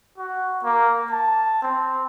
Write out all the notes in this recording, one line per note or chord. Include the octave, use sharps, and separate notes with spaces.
F#4
A#3
A5
C4